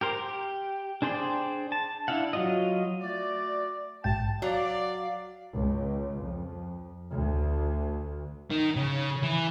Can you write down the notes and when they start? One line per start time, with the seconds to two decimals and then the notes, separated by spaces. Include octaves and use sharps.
0.01 G4 A#4 C5
0.18 G4
1.02 D4 G#4 C5 D5 G5
1.72 A5
2.08 D4 E4 F5 F#5
2.33 F#3 F4 D#5
3.01 A3 F#4 D5
4.04 A#1 G#2 G5 A5
4.42 F#3 D5 F5
5.57 C#2
6.20 F2
7.16 D2
8.51 D#3
8.76 C#3
9.23 E3